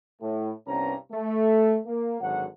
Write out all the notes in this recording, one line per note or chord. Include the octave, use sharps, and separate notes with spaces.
A2
C2 G2 B3 C#4 D4 A#5
A3
A#3
G#1 D3 F#3 F#4 F#5